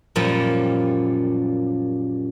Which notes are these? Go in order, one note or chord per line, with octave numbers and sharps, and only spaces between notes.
F#2 A#2 F3 G3